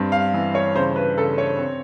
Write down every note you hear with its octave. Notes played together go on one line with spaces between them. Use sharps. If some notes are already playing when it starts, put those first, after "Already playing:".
Already playing: G2 C4
F5
E3
C#5
C#3 C5
B4
C#3 A4
C#5
C4